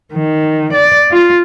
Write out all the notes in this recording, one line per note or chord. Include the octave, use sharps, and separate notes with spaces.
D#3
D5
F4